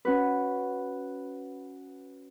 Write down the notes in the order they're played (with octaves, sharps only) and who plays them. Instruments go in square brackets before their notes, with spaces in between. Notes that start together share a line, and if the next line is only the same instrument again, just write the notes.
[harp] C#4 F#4 B4